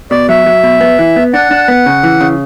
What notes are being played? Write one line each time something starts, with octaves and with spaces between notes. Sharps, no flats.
B2 D5
F#3 E5
F#3
B2
B3
E3
B3
D4 F#5
D4
B3
C#3
E3
C#3